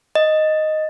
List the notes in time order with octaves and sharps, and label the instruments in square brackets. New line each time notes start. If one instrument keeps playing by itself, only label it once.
[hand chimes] D#5